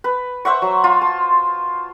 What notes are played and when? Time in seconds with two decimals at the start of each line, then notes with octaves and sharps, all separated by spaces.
0.04 B4
0.45 C5 E5 F#5 C#6
0.62 F#3
0.84 F4
1.01 A5